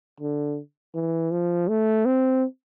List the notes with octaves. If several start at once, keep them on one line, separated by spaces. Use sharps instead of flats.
D3
E3
F3
A3
C4